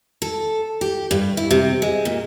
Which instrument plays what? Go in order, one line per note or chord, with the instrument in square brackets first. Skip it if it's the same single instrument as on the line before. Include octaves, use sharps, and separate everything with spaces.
[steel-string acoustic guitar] A4
G4
G2
E4
C3
G#3
A#2